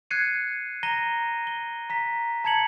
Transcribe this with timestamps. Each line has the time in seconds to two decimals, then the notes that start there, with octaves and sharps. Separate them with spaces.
0.11 F#6 G#6 C7 C#7 D#7
0.83 A#5 A#6 D#7 G7
1.47 G7
1.90 A#5 B6
2.44 A5 A#5 G#6 C#7 F#7